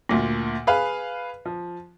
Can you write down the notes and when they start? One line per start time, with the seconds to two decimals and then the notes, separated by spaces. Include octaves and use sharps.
0.09 D2 A#2
0.67 G#4 B4 F5
1.45 F3